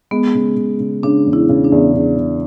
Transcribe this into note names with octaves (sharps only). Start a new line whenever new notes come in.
G#3 B3
C#3
C#3
C#3
C#3 D4
E2
E4
C#3
D4
E2
C#3
C#3